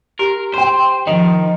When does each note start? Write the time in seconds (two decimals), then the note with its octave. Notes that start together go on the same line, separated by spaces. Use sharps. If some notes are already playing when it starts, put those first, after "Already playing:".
0.19 G4 A#4
0.54 C5 G5 C6
1.07 D#3 F3 D#5